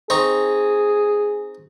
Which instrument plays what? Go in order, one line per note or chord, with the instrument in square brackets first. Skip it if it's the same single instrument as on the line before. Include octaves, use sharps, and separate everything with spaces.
[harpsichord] C4 D#4 C#6 [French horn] G#4